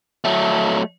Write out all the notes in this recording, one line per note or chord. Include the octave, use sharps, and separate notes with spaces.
F#3 A3